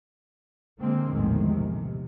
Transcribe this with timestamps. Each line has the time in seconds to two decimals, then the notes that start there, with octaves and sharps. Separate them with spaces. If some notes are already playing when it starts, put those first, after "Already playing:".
0.80 D3 G#3 A#3 C4
1.10 A#1 E2 A2 D#3 G#3
1.45 C3